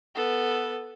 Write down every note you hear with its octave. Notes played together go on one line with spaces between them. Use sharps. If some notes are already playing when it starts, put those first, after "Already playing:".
B3 A4